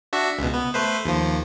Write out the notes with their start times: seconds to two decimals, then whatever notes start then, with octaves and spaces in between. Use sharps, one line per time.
0.13 D4 F#4 E5
0.39 C#2 B2
0.54 B3
0.74 A3 B4 C5
1.05 D#2 F3